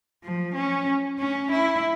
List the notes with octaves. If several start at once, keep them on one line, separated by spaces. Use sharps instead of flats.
F3
C#4
C#4
E4